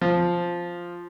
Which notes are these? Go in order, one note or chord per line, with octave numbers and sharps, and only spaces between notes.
F3